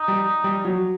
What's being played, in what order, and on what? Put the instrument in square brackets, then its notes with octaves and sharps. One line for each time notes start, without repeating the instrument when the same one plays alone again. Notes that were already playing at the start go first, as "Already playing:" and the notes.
Already playing: [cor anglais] D#4
[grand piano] G3
G3
F#3